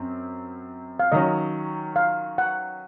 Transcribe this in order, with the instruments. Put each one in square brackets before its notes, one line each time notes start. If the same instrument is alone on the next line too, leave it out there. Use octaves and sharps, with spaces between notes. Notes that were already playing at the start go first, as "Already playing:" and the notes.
Already playing: [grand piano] F#2 F#3 C4
[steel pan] F5
[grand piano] D#3 F#3 C#4 [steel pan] D#5
[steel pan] F5
F#5